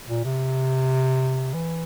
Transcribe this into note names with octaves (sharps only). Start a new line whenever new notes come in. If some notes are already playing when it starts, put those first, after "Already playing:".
A#2
C3
E3